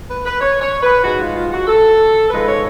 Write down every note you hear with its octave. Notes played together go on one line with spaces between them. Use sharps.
B4
B4
C#5
C#5
B4
G#2 G#3 F#4
F4
F4
F#4
A4
G#2 F3 G#3 B4
C#5